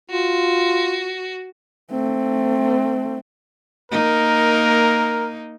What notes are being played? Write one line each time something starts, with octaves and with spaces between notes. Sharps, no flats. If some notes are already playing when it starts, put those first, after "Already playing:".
F4 F#4
A3 C4
A#3 D#4 A#4